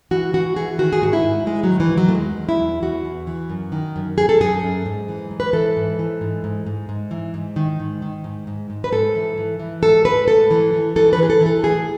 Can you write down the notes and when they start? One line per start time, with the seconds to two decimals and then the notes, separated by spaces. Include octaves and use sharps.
0.11 E3 F#4
0.33 E3 F#4
0.56 E3 G#4
0.79 D#3 F#4
0.93 G#4
1.02 G#2 F#4
1.13 E4
1.24 G#2
1.46 G#2 G#3
1.64 F#3
1.69 D#3
1.80 E3
1.92 D#3
1.98 F#3
2.09 A3
2.14 E2 G#3
2.37 E2
2.49 E4
2.60 E2
2.82 E2 F#4
3.05 E2
3.27 E3
3.50 F#2
3.72 D#3
3.96 F#2
4.18 F#2 G#4
4.29 A4
4.40 F#2 G#4
4.63 F#2
4.86 G#2
5.08 E3
5.31 G#2
5.40 B4
5.53 E3 A4
5.77 G#2
5.99 E3
6.21 G#2
6.44 G#2
6.67 G#2
6.89 G#2
7.11 E3
7.34 G#2
7.56 D#3
7.80 G#2
8.02 D#3
8.24 G#2
8.47 G#2
8.70 G#2
8.84 B4
8.92 G#2 A4
9.15 E3
9.38 E3
9.60 E3
9.83 G#2 A4
10.05 G#2 B4
10.28 A2 A4
10.51 E3
10.73 E3
10.96 E3 A4
11.13 B4
11.18 E3 G#4
11.30 A4
11.41 E3
11.46 A4
11.63 A2 G#4